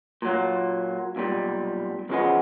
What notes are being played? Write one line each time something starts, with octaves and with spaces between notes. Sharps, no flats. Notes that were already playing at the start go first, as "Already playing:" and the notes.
A#2 F#3 A#3
B1 A#2 G3
E2 C#3 F3 G#3 B3